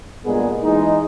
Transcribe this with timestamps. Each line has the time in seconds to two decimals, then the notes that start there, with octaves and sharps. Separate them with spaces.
0.25 G2 A#2 G#3 B3 G#4
0.63 E3 G#3 D#4